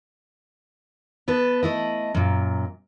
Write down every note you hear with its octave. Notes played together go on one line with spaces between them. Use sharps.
B3 A4 B4
A3 E4 D#5
F#2 A#2